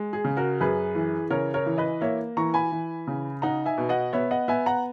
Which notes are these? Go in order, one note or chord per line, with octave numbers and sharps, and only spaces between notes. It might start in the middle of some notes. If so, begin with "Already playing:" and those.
Already playing: G#3
G#4
C#3
F#4 A#4
F#2 G#4 B4
E3
C#3 A#4 C#5
A#4 C#5
E3
B4 D#5
A#3 C#5 E5
E3 A#5 C#6
G#5 B5
E3
C#3
D#4 F#5 A#5
E5 G#5
B2
D#5 F#5
B3 C#5 E5
D#5 F#5
B3 E5 G#5
F#5 A#5